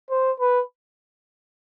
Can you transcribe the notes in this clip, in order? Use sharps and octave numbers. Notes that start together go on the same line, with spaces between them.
C5
B4